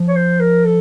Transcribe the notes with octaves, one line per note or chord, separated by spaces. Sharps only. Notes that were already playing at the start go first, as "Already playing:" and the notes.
Already playing: F3
C#5
C5
A#4
A4